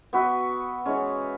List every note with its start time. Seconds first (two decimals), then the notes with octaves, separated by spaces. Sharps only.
0.13 B3 F#4 B4 E5
0.85 E3 G#3 C#4